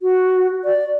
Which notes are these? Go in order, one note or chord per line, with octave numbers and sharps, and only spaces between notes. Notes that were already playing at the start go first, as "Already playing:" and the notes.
F#4
D5